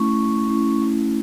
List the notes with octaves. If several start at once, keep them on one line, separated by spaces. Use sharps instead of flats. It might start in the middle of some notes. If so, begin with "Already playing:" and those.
Already playing: A3 C#4 E4 C#6
A3 C#4 E4